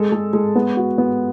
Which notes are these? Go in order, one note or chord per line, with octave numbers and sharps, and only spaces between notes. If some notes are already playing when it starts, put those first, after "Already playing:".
Already playing: G#3 A4
G#3
G#3
B3
F#4
B3